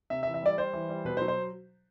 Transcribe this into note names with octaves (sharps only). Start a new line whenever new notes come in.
C3 E5
E5
E3
E5
G3 D5
G3 C5
E3
G3
B2 B4
C5
F#3
C5